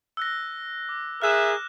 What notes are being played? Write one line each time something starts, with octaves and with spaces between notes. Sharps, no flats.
E6 F#6 A#6
D6
G#4 A#4 E5 F6 F#6 E7